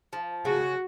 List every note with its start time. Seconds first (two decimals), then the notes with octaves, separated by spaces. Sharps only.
0.13 F3
0.45 C#3 F#4